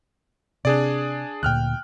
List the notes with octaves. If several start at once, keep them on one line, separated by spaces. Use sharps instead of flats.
C3 D4 G#4 D5
D2 A#2 G5 F6 F#6